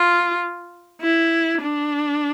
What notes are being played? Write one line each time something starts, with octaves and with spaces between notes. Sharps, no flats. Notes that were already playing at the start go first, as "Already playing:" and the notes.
Already playing: F4
E4
D4